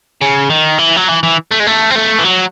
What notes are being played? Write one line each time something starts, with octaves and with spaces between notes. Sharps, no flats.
C#3
D#3
E3
F#3
E3
E3
A3
G#3
A3
C4
A3
E3
F#3